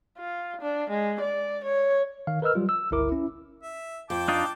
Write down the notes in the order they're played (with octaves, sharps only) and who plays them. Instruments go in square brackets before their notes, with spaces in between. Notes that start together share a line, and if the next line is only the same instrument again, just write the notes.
[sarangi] F4
D4
G#3
D5
C#5
[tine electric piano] D#3 F5
A#4 B4 D#5 E6 F6
F#3 G3 F4
E6
G1 C#2 E4 A#4 D6
C#4 E4
[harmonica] E5
[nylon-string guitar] F2 [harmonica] G5 A5 D6
[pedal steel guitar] D4 D#4 F4